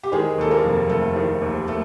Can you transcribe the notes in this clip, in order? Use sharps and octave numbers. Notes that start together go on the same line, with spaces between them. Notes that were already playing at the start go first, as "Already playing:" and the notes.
G4
D#3 G#3 G#4
D#2 A4
A#3 A#4
F1
F1 A3 A4
D#3
D#2
A3 A4